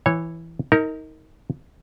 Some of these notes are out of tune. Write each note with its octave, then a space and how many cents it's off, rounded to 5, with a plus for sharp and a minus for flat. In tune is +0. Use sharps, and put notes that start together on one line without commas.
E3 +0 C#5 -15
D#4 +25 A#4 -20